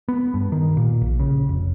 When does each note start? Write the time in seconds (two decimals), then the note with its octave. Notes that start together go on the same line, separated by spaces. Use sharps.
0.08 B3
0.34 G2
0.52 D#3
0.77 A#2
1.02 A#1
1.20 C#3
1.49 F1